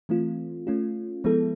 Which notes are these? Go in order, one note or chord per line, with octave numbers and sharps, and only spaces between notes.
E3 A3 C4 F4
A3 C#4 F4
F3 G#3 B3 E4 A4